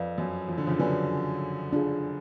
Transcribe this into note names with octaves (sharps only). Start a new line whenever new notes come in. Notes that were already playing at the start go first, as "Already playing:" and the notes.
Already playing: F2 B4 D5 F5
F#2
F3
D3
C#3 F3
D3 F#3 B4 D5 G#5
D4 F4 G#4